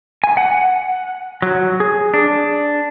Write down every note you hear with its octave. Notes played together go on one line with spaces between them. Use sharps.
G#5
F#5
F#3
G#4
D4